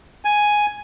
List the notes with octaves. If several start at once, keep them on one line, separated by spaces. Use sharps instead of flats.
G#5